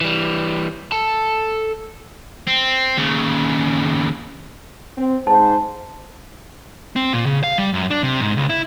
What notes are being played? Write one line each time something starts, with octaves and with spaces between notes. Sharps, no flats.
E3 G3
A4 A5
C4
D#2 C#3
C4
G#2 C5 A5
C4
A#2
C#3
F5
G3
F#2
D4
C3
G#2
C#2
E4